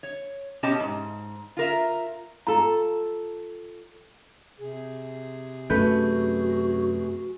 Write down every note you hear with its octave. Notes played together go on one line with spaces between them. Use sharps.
C#5
B2 C#4 G4 D#5 A5
G#2
F4 A#4 E5
F4 A4 A#5
C3 G#4
F#2 A3 C#4 F#4 B4 G6